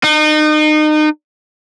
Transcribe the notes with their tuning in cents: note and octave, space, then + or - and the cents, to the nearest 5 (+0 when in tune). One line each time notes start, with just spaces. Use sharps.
D#4 -30